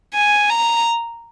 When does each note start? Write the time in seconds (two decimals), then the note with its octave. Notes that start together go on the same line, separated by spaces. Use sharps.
0.14 G#5
0.50 A#5